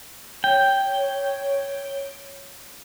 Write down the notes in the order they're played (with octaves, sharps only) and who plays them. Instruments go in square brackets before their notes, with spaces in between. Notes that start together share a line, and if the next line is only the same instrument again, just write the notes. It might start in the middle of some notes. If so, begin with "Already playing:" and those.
[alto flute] C#5 [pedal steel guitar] G5